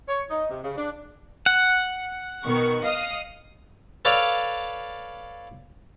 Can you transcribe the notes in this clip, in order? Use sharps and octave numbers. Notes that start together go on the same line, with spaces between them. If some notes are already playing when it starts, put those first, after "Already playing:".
C#5
D#4
C3
C#3
D4
F#5
B2 D#3 C#6
D#5 F5 D#6
A4 B4 C#5 D5 F5